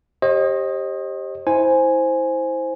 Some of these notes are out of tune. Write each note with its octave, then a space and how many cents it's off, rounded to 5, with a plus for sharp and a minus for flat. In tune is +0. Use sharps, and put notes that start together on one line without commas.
G4 +0 C5 +45 D#5 +0
E4 -25 C5 +0 G#5 +0